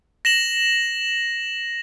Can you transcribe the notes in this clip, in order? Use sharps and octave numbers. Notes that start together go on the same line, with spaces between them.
A#6 E7 F#7